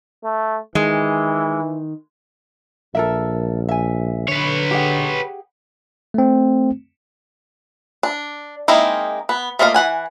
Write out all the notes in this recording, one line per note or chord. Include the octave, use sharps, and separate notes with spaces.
A3
D#3 E3 G#3
A#1 A4 A#4 E5
E5 G#5
D3 B4 C#5
G4 G#4 F#5
A3 C4
D4
G#3 A#3 C4 D#4 E4
B3
A3 A#3 F4 D#5 F5
E3 F#5 G#5